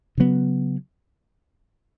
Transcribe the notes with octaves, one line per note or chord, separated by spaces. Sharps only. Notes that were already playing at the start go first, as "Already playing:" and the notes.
C#3 F#3 B3